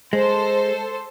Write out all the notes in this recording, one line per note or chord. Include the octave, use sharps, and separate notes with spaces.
G#3 A4 C5